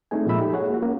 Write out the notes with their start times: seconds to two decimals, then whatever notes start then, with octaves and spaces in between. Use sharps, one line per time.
0.11 A3 C4 D4 D#4 G#4 G#5
0.27 A#2 F3 G#3 E5 B5 E6
0.39 D#4 F#4 G4 A4
0.53 G#4 C#5 F#5
0.70 A#3 F4 F#4
0.82 A#3 C#4